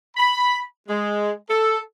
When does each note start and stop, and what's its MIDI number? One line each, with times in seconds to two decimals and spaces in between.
0.17 0.61 83
0.88 1.32 56
1.49 1.78 69